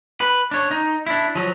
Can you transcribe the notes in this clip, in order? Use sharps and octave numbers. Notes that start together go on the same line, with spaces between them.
B4
D4 C#5
D#4
D4 E4
F3 F#3